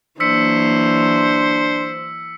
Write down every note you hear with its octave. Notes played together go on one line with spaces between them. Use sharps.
E3 F#3 A#3 D4 C5 E6 B6 C#7